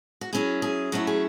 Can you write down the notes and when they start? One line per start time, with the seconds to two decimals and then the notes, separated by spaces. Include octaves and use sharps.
0.21 F#4
0.33 F#3 C#4 E4 G#4
0.62 G#4
0.92 F#3 A3 C#4 E4 F#4
1.07 G#4